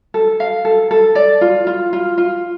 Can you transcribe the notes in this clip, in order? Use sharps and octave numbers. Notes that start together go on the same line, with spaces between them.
A4
F5
A4
A4
D5
F4
F4
F4
F4